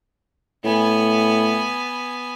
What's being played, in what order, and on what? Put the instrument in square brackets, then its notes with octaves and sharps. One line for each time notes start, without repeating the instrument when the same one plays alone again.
[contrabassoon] A2 [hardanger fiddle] B3 G#5